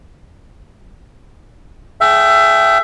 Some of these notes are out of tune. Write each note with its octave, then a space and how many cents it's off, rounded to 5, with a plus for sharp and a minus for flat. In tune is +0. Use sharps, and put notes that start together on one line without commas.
G#4 +25 E5 +20 G5 -20